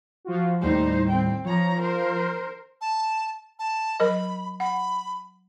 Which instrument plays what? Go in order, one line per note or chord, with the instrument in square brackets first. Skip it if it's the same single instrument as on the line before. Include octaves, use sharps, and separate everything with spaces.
[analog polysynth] F3 F4 F#4
[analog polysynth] D#2 A2 G3 [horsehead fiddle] D#4 C5
[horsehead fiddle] C4 G5
[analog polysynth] F3 [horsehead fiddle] C#5 A#5
[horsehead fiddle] A#4 C5
[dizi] A5
A5
[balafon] F#3 A#4 D#5 [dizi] B5
[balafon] F#5 [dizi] B5